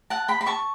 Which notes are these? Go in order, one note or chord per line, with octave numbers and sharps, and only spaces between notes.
F#5 A5
G5 B5
B5
A5 C#6